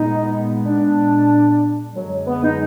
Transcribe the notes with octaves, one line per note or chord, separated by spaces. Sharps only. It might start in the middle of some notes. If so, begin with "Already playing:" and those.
Already playing: A#2 G#3 B3 D#4
D4
F#2 D3 F#3 G#3
B3
D#4